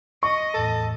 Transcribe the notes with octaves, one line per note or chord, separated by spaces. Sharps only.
D#5 C#6
E2 A2 A4